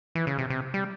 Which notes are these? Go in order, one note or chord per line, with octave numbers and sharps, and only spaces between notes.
E3
C#3
C3
C3
G3